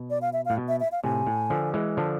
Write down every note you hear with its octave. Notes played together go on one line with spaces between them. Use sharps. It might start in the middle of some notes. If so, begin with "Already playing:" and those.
Already playing: B2
D5
F5
E5
F5
A2
B2
E5
E5
F5
A2 C3 G#5
A2
D3 F3
E3 G#3
D3 F3 A5